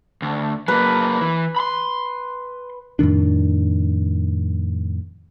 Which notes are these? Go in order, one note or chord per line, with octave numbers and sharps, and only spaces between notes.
D2
F#3 A#3 B4
E3
B5 C6
F2 A2 D#3 D4